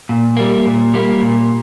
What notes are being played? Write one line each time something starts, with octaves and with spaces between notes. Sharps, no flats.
A#2
G3 A#3
A#2
G3 A#3
A#2